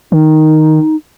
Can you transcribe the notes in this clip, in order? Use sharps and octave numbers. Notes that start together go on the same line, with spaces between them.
D#3 D#4